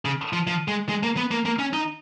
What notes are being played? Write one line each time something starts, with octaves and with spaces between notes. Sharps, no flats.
C#3
F3
F3
G#3
G#3
A#3
B3
A#3
A#3
C#4
D#4